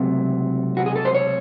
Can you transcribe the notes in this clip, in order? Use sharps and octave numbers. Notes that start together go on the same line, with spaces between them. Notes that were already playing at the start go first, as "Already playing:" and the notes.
Already playing: C#2 C3 F#3 A3 C4
F#4
G#4
A4
C5
C#5